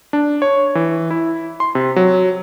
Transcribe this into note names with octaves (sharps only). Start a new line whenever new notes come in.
D4
C#5
E3
E4
C6
C3
F#3